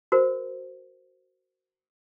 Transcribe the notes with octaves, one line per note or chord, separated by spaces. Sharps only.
F#4 A#4 C5